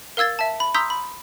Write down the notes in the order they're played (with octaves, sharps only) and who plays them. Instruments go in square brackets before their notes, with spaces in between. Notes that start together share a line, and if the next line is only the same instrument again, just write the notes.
[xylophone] A#4 F5 E6 G#6 A6
E5 A5
B5
A#5 C6 D#6 E6 G6 B6
B5